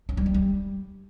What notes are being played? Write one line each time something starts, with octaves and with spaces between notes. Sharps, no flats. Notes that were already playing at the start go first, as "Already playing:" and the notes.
C#4
G3
D4
G3